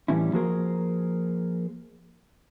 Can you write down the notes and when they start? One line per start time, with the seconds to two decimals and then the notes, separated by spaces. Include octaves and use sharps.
0.08 A2 E3 G3 A#3 C#4 E4
0.33 F3 A#3 F#4 G#4 A#4 C5